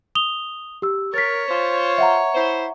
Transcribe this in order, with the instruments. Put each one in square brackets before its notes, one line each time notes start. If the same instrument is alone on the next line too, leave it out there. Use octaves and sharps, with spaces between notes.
[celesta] D#6 F7 G7
G4 E6
[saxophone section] A#4 [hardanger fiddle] C#5 [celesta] A6 B6
[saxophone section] F4 C5
[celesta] E5 F#5 A#5
[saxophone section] E4 C5